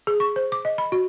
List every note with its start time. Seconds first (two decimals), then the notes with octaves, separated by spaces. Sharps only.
0.07 G#4
0.20 C#6
0.36 C5
0.52 D6
0.65 D#5
0.78 B5
0.92 F#4